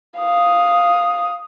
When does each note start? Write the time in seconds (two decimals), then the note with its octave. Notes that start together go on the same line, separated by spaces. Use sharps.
0.19 F5 D#6